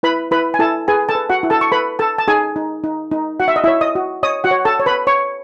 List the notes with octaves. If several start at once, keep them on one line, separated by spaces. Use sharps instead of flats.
E4 B4 B5
E4 B4 B5
G#5
E4 A4 A5
G#4 B4 G#5
A4 A5
B4
F#4 F#5
E4
A4 A5
C#6
A4 B4 B5
A4 A5
A5
D#4 G#4 G#5
D#4
D#4
D#4
F#4 F#5
E5
D#5
E4 C#5 E5
D#5 D#6
F#4
C#5 D#5 D#6
F#4 F#5
C#5
A4 A5
C#5
B4 B5
C#5 C#6